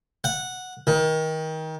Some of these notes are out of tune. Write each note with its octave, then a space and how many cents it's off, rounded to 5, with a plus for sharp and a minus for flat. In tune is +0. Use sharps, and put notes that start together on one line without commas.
F#5 -10
D#3 +25